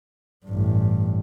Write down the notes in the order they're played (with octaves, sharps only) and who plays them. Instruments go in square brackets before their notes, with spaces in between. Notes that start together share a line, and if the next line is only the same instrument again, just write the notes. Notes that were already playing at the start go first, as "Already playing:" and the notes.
[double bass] A1 G2